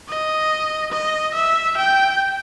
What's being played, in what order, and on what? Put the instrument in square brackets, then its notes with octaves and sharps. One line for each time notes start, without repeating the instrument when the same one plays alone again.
[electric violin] D#5
D#5
E5
G5